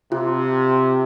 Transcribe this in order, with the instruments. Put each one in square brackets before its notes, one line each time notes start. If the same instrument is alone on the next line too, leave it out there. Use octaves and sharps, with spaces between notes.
[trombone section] C3 [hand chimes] F4